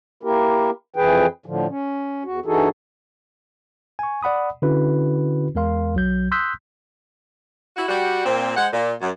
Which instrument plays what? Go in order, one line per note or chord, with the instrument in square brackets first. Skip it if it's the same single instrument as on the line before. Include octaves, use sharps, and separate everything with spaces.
[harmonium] A#3 E4 G4 A#4
F2 E3 G#4 B4 G5
A2 D3 F3
C#4
E2 F#4
G2 E3 D#4 F#4 G#4 A4
[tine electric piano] G#5 C#6
D5 F#5 B5 D#6
D3 C#4 E4 F#4 B4
E2 G#3 A#4 F5 C6
B1 F#3 G6
C6 D#6 E6 F#6 G6 B6
[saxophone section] E4 F#4
G3 F#4
A#2 C4
G#3 C5 F#5
A#2
F#2